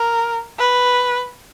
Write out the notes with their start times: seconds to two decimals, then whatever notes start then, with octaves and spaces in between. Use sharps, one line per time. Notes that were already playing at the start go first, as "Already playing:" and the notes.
Already playing: A#4
0.58 B4